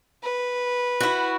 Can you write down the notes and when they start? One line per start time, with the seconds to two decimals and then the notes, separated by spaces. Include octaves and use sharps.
0.23 B4
1.00 E4 F#4